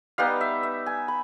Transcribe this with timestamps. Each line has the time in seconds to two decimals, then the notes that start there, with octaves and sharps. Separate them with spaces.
0.18 G3 B3 D#4 F5
0.41 E5
0.63 E5
0.86 G#5
1.08 B5